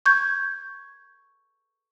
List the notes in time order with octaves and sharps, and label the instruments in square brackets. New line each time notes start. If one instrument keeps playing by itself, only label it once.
[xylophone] C#6 G6 G#6